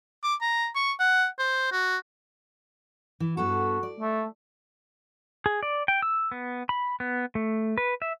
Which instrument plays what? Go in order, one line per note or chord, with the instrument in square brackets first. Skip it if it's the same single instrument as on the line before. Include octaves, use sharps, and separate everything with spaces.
[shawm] D6
A#5
C#6
F#5
C5
F#4
[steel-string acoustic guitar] E3
[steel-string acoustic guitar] G2 B3 A4 [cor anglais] F#4
[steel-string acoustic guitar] D5
[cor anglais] A3
[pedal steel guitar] G#4
D5
G5
E6
B3
B5
B3
A3
B4
E5